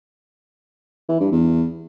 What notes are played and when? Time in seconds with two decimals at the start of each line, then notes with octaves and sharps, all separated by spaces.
1.09 E3
1.20 G2
1.32 E2